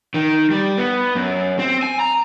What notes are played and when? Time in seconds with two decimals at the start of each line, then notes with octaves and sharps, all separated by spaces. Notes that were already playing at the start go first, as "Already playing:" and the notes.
0.14 D#3
0.51 G3
0.78 B3
1.15 F#2
1.59 C4
1.83 G#5
2.00 A#5